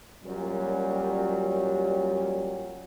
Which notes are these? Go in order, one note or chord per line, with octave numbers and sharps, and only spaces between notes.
F#2 A#2 F#3 G3